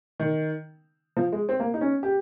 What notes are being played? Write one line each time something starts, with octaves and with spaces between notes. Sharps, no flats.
D#3
F3
G#3
C4
A#3
D#4
C#4
G4